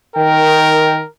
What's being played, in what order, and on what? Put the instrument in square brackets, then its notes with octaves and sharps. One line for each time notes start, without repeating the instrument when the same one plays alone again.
[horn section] D#3 G5 [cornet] A#4